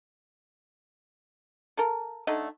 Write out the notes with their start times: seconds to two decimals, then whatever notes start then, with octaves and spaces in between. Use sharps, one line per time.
1.77 A4 A#4
2.27 D3 A3 D#4 D#5